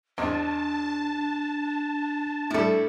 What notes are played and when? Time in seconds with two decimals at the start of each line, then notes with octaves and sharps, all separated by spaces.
0.18 E2 C4 D4 D#4 A5
2.50 A2 G3 E4 A4